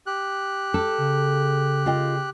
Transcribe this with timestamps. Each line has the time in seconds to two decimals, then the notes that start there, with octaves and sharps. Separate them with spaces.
0.07 G4 F#6
0.74 A4
0.98 C#3
1.86 F4 D#5 G5